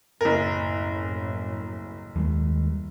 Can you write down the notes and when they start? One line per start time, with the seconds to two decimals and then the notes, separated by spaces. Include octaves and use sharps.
0.21 F#1 C2 F#2 A2 A#4
2.16 D#2 G3 G#3